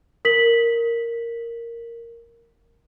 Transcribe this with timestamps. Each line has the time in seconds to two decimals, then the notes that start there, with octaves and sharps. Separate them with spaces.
0.25 A#4 B6 F#7